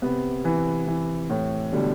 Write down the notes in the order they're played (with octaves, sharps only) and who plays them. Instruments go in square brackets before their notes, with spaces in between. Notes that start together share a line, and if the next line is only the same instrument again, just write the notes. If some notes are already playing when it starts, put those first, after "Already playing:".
[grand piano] C3 [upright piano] B3
[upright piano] E3
E3
A2
[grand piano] B2 D3 [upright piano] G3